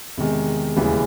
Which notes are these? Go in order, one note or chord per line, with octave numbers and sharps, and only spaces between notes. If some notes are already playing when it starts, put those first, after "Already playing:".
E2 C3 D#3 G#3
E1 D#2 C#3 E3 G3